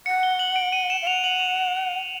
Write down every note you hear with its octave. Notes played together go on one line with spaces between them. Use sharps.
F#5 C#7
G7
F#7
D7
D#7
E7
F5
F#5 F7
F#7
F7